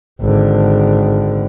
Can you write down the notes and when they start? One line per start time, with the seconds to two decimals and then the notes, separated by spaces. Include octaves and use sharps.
0.21 G#1 D3